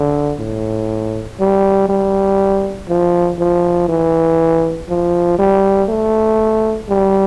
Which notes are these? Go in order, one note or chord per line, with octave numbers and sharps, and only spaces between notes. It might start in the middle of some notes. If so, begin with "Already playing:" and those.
Already playing: D3
A2
G3
G3
F3
F3
E3
F3
G3
A3
G3